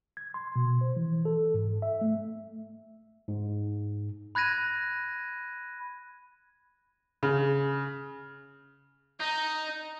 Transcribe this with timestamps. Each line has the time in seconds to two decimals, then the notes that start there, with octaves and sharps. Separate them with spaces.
0.17 G#6
0.34 C6
0.56 B2
0.81 C5
0.96 E3
1.25 A4
1.54 G#2
1.82 E5
2.01 A3
3.28 G#2
4.35 B5 F#6 G#6 A#6 D#7
7.23 C#3
9.20 D#4 D#5 A#5